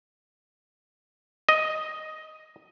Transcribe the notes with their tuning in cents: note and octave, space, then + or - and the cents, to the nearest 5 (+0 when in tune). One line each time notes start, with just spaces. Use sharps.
D#5 +5